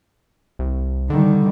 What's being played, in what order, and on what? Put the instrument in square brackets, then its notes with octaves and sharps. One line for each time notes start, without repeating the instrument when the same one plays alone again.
[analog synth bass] C2
[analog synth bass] D3 [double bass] D#3 G3